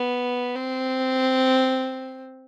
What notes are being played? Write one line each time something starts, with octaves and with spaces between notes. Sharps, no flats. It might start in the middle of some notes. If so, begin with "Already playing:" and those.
Already playing: B3
C4